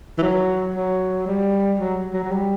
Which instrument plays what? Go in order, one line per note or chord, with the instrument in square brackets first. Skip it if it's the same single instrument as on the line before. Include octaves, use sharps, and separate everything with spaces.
[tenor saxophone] E3
F#3
F#3
G3
F#3
F#3
F#3
G3